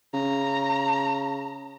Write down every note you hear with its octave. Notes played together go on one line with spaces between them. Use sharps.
C#3 A#5